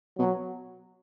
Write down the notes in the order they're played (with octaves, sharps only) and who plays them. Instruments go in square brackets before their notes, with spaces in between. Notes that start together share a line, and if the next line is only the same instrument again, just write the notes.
[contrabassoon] B2 [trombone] F#3